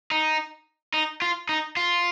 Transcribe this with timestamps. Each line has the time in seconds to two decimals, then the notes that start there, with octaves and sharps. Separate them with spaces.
0.11 D#4
0.94 D#4
1.22 F4
1.49 D#4
1.77 F4